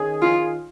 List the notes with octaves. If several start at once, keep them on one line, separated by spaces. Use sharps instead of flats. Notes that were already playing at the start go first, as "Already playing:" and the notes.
Already playing: D#3 C#4 G#4
F4